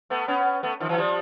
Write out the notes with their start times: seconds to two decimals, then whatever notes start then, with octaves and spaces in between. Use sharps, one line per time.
0.10 A3 B3
0.28 B3 C#4
0.63 A3 B3
0.80 D#3 F3
0.89 E3 F#3
0.98 F3 G3